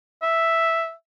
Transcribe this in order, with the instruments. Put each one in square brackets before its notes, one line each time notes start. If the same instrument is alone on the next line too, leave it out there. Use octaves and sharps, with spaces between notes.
[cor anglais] E5